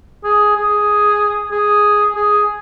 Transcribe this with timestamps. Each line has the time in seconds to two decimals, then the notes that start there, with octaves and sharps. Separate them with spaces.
0.24 G#4
0.56 G#4
1.51 G#4
2.15 G#4